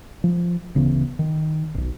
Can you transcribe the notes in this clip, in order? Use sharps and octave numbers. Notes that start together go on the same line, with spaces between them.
F3
D1 C#3 E3 B3
D#3
D1 B1